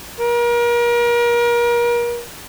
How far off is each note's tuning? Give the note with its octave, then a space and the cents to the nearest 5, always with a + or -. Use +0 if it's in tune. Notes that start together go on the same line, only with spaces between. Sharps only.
A#4 +35